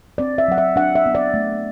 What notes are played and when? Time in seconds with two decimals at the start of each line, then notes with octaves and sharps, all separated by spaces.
0.18 C4 D5
0.38 E5
0.48 F#3 F#5
0.58 E5
0.76 D4 F#5
0.95 E5
1.06 B3
1.15 D5
1.34 A3